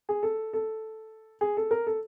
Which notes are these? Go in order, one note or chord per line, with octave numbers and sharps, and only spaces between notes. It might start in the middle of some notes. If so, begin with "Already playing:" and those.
G#4
A4
A4
G#4
A4
A#4
A4